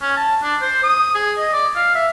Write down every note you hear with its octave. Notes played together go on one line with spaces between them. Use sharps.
C#4
A5
D4
C5
D#6
G#4
D#5
D5
F5
E5